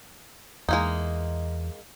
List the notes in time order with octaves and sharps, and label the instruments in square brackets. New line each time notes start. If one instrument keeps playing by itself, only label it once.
[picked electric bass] E2 [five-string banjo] G#3 A#3 D#4